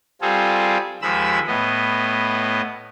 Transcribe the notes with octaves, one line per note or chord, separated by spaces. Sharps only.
G3 C4 F4 G#4 A4
D#2 F3 G#3 B5 E6
A2 B3 D#5